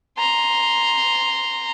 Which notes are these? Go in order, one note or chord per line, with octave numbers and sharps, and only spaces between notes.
A#5 C6